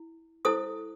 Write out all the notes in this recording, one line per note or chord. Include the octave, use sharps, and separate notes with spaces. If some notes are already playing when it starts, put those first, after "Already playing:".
Already playing: E4
E4 A4 C5 D#6